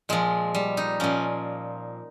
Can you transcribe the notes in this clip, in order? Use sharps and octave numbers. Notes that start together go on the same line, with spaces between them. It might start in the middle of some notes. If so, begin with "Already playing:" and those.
A#2 F3 G#3
G3
D#4
A#2 F3 C#4